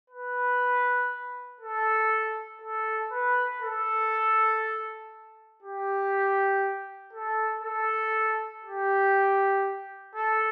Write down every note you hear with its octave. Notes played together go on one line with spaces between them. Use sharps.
B4
A4
A4
B4
A4
G4
A4
A4
G4
A4